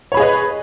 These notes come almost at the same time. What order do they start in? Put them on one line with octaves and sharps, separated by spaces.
C#5 B5 G#4 D#5 B4